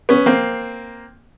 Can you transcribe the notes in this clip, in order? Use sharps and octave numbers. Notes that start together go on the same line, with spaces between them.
B3 C#4
A#3 C4